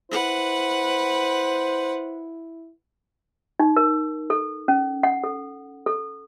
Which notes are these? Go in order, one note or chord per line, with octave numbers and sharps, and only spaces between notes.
E4 B4 C5 F#5
D#4
A#4
A4
C#4
F#5
A4
A4